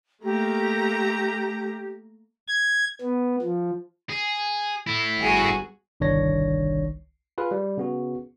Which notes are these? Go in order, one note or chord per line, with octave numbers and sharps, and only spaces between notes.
A3 A#3 G4 A#5
G#6
B3
F3
G#4
E4 A4
G1 F#4 G#4
G1 C2 D#3 D4 C#5 A#6
F4 G#4 B4 F5
G3
C#3 B3 F#4